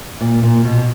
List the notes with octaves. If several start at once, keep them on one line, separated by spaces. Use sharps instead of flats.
A#2
A#2
B2